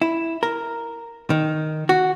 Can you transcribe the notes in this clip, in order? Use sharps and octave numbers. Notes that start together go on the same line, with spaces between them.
E4
A#4
D#3
F#4